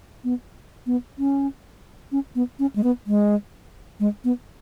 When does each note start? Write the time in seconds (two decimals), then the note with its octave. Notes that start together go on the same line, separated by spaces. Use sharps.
0.24 B3
0.86 B3
1.19 C#4
2.12 C#4
2.35 B3
2.59 C#4
2.76 G#3
2.84 B3
3.07 G#3
4.00 G#3
4.24 B3